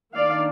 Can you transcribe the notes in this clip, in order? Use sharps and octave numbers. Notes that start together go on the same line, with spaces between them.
D#3 A#3 D4 D5 F5